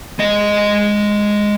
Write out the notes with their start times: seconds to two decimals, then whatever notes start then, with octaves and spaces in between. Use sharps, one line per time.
0.19 G#3 D#5